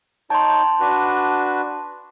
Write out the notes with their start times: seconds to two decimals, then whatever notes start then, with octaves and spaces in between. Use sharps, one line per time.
0.30 D#4 C#5 G5 A5 C6
0.80 D4 F#4 B4